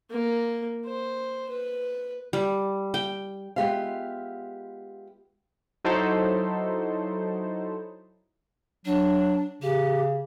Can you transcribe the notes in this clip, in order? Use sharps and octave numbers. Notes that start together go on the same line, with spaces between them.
A#3
C5
B4
G3
G5
G#3 B3 F4 G4 E5 F5
F#3 D#4 E4 A4 C5
F#3 D4
C#3 G4